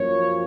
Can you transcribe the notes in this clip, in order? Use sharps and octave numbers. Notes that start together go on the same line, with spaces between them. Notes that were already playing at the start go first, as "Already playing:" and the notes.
Already playing: F#2 F3 A#3 C#5